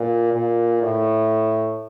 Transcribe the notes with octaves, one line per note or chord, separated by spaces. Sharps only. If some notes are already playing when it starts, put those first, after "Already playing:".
Already playing: A#2
A#2
A2